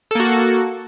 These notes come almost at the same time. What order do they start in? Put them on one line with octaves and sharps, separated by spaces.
A4 A#3 F#4